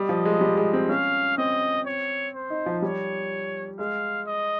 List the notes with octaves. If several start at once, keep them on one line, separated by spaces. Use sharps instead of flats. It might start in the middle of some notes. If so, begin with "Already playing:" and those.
Already playing: G3 D#5
F3
G#3
G3
G#3
C4
C#4 F5
C4 D#5
C#5
C5
D#4
F3
G3 C#5
G#3 F5
D#5